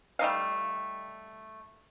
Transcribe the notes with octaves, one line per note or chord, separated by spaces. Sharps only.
G3 A3 D#4 F5